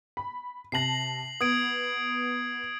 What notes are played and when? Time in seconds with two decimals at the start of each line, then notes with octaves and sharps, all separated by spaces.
0.17 B5
0.72 C3 A5 A#6 C7 F#7
1.41 B3 D#6 G#6 D7